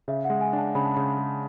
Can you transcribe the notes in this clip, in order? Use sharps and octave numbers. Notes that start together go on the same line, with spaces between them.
C#3 E5
F#5
G#3
G#5
D4 A5
C#3 B5
A5
C#3 B5
G#3